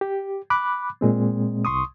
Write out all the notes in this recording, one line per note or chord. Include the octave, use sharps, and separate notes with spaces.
G4
B5 D6 F#6
A#2 G#3 C4
C2 C6 C#6 D#6